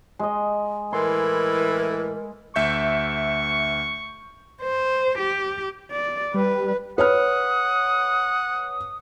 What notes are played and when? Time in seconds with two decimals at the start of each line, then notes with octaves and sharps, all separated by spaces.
0.19 G#3 D#5
0.93 A2 E3 A#4 C6
2.56 D2 E5 C#6 G6
4.62 C5
5.19 G4
5.91 D5
6.34 G3 B4
6.98 B4 C#5 F#5 D#6 F6